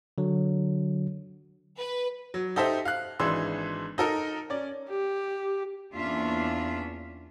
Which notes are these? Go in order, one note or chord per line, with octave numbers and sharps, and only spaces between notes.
D3 F#3
B4
F#3
D#4 G4 A4 C5 E5
F5 F#6
G#1 E3 G#3 D4 C6 E6
D#4 A4 A#4
C#4 D5
G4
E2 A#3 C#4 D4 F4 E5